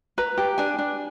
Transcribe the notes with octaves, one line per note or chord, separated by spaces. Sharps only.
B4 A#5
G4
D4 G#5
D4